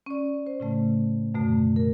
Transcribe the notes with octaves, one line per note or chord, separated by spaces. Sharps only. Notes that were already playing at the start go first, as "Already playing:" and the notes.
C#4 D5
C5
A2 C#3 A3
F#2 B2 D3 A3
A#4